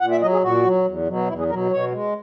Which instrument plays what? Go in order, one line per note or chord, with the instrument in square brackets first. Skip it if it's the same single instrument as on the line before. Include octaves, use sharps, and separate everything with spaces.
[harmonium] A#2 F#5
E5
F#3 D#5
G#4
A#2 F#4
F#3
E2
B2 F#3
E2 E4
G#4
B2 F#3 A#4
B2 C#5
G#3